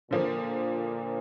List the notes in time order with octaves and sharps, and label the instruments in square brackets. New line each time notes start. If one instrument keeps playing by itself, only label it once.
[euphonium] A#2 [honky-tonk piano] D3 F3 A#3